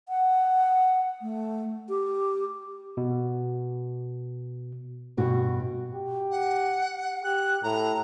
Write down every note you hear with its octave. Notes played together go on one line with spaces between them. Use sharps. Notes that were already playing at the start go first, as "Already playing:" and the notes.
F#5
A3
G4
B2
G2 B2 F#4
G4
F#5
G4 F#6
A2 A#5